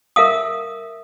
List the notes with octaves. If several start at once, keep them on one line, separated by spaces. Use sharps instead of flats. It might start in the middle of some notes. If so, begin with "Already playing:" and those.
A#4 E5 F5 D#6